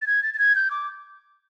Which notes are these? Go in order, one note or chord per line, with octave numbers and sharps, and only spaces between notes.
A6
G#6
A6
A6
G#6
G6
D6